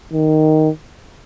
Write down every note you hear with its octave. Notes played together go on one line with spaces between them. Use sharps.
D#3